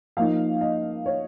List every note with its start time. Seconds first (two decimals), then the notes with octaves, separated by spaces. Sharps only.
0.17 F3 A#3 D#4 F5
0.61 D#5
1.06 C#5